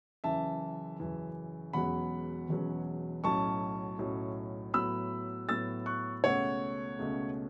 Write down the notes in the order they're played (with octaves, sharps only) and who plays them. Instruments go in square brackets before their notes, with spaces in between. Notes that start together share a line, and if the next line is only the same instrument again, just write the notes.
[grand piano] F#1 F#2 E3 E5 A5
F#1 F#2 E3
E1 E2 B2 F#3 C#4 F#5 B5
E1 E2 B2 F#3 C#4
B1 A2 F#3 C#4 A5 C#6
B1 A2 F#3 C#4
A2 F#3 B3 B5 E6
A2 F#3 B3 E6 A6
C#6 F#6
C#2 B2 A3 C#4 C#5 F#5
C#2 B2 A3 C#4